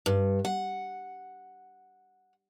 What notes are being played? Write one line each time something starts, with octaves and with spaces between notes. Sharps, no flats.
G2
F#5